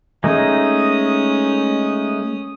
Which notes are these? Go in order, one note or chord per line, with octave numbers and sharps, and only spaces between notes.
G#3 A3 C#4 D#4 D#6